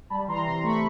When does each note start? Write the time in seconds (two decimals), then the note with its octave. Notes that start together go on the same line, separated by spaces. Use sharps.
0.10 G3 A5 B5
0.28 E3 A#5 C6
0.46 C3 A#5 C6
0.64 A3 B5 C#6